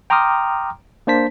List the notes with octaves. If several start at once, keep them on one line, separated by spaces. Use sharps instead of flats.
G5 A#5 C6 D6 D#6 F6
A#3 D4 C5 A5 B6